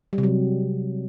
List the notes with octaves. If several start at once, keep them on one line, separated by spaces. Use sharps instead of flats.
G3
C3
F#3